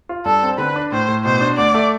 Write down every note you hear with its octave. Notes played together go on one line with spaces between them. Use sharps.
F4
G2 A4
C4
D3 B4
D4
A2 C5
A2
B2 C5
D4
D2 D5
A3